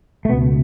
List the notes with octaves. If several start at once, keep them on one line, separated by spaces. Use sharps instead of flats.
A3
C#2 B2 B3